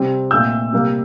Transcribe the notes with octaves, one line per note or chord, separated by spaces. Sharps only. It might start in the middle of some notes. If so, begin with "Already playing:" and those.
Already playing: C3 G3 C4
A#2 A3 C4 E6 G6
C3 G3 A#3